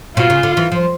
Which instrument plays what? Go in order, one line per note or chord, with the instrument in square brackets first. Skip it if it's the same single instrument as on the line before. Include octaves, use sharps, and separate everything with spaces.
[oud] B2 [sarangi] F4
[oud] C#3
D3
E3
F3